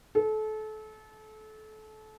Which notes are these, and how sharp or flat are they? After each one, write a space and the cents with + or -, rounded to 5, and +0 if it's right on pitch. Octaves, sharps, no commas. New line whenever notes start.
A4 -30